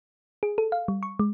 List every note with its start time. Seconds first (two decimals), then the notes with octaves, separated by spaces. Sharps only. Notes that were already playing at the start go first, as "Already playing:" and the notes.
0.43 G#4
0.58 A4
0.72 F5
0.88 G3
1.03 C#6
1.19 G#3